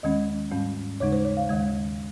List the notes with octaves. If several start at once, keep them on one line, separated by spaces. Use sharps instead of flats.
D#2 D#3 G#3 C#4 D#5
G#2 G3 C#4
D#2 C#3 G#3 D#4 C#5
C5
C#5
F5
D#2 D#3 G#3